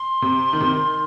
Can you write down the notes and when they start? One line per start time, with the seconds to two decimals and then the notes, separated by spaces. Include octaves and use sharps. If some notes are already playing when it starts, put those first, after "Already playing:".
Already playing: C6
0.22 C3
0.53 D#3
0.61 C3
0.68 D#3